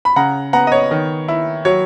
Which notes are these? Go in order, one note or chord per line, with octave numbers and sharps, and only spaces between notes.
B5
C#3 F#5 A#5
B3 F#5 A#5
D#5
C#5
D#3
E4
F#3 C#5